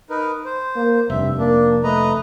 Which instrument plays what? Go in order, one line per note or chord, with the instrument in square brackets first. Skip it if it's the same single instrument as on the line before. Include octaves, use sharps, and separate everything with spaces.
[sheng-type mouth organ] D#4 A#4 B4
C5
[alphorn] A#3
[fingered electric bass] F1 [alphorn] G2 [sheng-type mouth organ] E5
[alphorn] A#3 [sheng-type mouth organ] D4
[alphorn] A3 [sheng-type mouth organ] B4 D#5 A#5